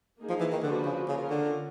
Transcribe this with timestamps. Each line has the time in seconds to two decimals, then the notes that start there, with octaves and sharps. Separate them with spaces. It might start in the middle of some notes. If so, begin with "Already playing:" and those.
0.19 A#3 D#4 G#4
0.29 F3
0.40 E3
0.52 D#3
0.63 D3 F3 A#3 D4 F#4 B4
0.86 C#3
1.08 C#3 C#4 F4 A#4
1.30 D3